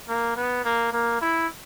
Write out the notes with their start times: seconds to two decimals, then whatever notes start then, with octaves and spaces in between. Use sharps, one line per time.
0.09 A#3
0.36 B3
0.65 A#3
0.93 A#3
1.21 E4